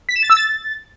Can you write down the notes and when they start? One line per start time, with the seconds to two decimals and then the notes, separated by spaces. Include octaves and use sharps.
0.09 B6
0.16 E7
0.23 A6
0.30 E6
0.37 A6